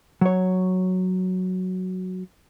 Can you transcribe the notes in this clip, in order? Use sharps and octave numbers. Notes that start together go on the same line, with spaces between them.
F#3 C#5